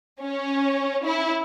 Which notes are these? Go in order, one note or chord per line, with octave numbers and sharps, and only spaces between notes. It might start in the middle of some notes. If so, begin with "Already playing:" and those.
C#4
E4